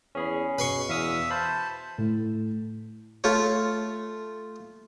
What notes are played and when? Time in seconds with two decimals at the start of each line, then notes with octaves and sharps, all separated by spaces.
0.15 E2 C#4 G#4 B5
0.59 B2 B4 C6 C#6
0.89 E2 E5 F5 D#6 B6
1.31 C5 A5 B5
1.98 A2
3.24 A3 F4 C#5